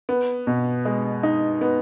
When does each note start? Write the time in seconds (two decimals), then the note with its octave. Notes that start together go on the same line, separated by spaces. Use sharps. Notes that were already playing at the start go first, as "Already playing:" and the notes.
0.09 B3
0.47 B2
0.85 G#3
1.23 D#4
1.61 B3